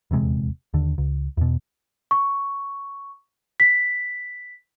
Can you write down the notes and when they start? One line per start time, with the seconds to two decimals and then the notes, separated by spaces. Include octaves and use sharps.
0.11 D#1 E2 C3 G#3
0.74 D#2 D3
0.98 C#2
1.37 E2 B2
2.11 C#6
3.60 B6